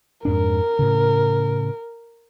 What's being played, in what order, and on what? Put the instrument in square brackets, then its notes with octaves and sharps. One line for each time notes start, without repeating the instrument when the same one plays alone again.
[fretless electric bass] F2 G#2 D4 [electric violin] A#4
[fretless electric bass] A2 C#3